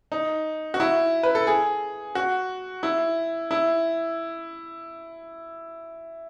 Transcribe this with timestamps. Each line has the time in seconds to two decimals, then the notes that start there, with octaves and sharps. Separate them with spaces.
0.12 D#4
0.74 F#4
0.80 E4
1.23 B4
1.35 A4
1.47 G#4
2.15 F#4
2.83 E4
3.51 E4